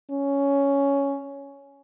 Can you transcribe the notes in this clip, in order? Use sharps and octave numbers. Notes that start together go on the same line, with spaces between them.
C#4